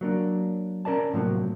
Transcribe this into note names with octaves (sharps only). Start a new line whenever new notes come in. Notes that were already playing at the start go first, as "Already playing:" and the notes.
F#3 A#3 D4
C#4 A#4 D5 A5
A2 C3 F3 F#3 A#3